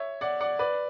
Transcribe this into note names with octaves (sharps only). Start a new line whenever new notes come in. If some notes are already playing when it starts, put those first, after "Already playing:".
Already playing: C#5 E5
D5 F#5
D5 F#5
B4 D5